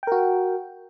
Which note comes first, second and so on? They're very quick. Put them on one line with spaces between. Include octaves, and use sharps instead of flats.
G5 A#4 F#4